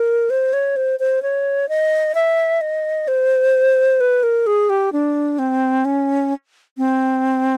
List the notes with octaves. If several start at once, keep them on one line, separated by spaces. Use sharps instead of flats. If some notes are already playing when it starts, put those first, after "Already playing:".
Already playing: A#4
C5
C#5
C5
C5
C#5
D#5
E5
D#5
C5
B4
A#4
G#4
G4
D4
C4
C#4
C4